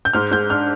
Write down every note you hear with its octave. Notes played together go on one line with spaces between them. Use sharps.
G6
G#2 F6
G#2 G6
D4 F6